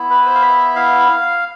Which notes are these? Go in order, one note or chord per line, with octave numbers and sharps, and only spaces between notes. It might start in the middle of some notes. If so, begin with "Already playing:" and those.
Already playing: B3 E4
B4
C5
F5
E5
F5